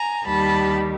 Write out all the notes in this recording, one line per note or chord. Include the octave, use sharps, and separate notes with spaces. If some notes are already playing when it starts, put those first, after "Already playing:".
Already playing: G#5 A#5
D#2 D#3 G3 A5 B5